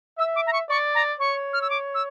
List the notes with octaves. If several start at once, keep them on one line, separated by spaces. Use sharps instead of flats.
E5 E6
D6
A#5
C#6
D5 C#6
A#5
C#5 C#6
F6
E6
D6
E6